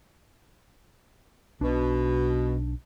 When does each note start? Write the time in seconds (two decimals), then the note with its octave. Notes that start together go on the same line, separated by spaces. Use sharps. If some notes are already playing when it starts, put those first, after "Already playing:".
1.61 B1 B2 D4